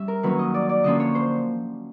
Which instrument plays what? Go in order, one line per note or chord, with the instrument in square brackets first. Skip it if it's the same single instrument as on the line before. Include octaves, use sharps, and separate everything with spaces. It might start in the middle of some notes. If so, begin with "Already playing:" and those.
Already playing: [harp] G3 C#4 E5
A#4
D#3 F#3 A#3 C#4 B4
D#5
D5
D5
D3 F3 A#3 C#4 D#5
C#5
C5